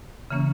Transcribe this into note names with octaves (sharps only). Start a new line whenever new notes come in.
C#3 E3 A#3 C#4